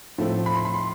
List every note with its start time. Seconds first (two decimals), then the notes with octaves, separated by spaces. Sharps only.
0.18 A2 F3 A3 C4
0.46 B5
0.56 C6
0.65 B5
0.74 C6